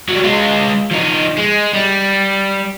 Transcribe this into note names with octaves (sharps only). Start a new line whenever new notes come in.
F#3 G3
G#3 F4
F3 D#4
G#3
G3